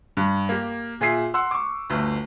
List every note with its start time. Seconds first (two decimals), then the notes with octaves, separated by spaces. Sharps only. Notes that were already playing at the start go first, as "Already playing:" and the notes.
0.17 G2
0.49 A#3 G4
1.01 A#2 G#4 E5 C7
1.34 F#5 C6 E6
1.51 C#6 D6
1.90 G1 D2